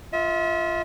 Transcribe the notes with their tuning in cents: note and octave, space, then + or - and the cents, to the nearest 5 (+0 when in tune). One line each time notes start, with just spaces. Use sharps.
F4 -5 E5 -40